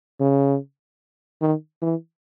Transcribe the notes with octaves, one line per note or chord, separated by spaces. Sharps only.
C#3
D#3
E3